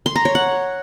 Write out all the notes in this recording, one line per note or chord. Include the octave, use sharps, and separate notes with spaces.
C6
A#5
C#5
F#5